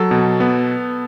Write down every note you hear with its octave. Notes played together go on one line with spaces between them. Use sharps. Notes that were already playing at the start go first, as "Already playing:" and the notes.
Already playing: F#3 A4
B2
B3